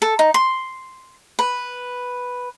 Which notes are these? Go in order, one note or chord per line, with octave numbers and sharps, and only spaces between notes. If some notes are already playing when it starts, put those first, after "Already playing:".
A4
D#4
C6
B4